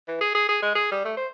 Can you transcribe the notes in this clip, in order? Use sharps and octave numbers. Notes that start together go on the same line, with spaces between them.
E3
G#4
G#4
G#4
G#3
G#4
G3
A3
C5